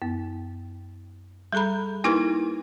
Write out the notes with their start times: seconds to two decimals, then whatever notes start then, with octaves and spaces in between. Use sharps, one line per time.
0.02 F#2 B3
1.53 G3 G#4 A4 A#5 B5
2.04 A#3 D#4 E4 G4 A#4 B4